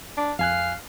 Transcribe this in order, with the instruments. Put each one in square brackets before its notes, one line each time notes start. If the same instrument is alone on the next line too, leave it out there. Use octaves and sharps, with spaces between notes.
[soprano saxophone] D4
[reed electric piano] F2 G#5 F#6 [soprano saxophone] F5